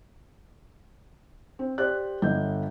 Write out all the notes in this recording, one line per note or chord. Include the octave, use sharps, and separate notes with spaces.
C4
G4 C5 D5 F#6
G1 D#5 G6